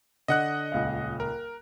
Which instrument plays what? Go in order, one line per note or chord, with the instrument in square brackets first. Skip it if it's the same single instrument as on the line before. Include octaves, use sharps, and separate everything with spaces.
[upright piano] D3 D4 [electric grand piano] D#5 F#5 F#6
[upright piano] D#1 C#2 F5
[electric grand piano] A#4